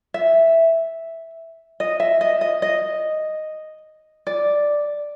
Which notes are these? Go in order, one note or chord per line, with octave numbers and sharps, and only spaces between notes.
E5
D#5
E5
D#5
D#5
D#5
D5